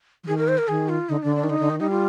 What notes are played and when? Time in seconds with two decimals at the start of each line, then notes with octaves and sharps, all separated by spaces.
0.24 F3
0.27 D#3 G#4
0.38 A#4
0.48 C5
0.58 A#4
0.68 D#3 G#4
0.89 F4
1.09 D3 D#4
1.22 D3 D4
1.36 D4
1.44 D#3
1.50 D3 D#4
1.60 D3
1.70 D#3
1.80 G3 D#4
1.90 F4